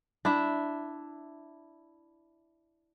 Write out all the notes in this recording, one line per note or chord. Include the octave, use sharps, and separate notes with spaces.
D4 E4 E5